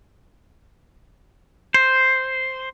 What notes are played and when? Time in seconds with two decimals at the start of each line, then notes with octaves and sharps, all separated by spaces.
1.74 C5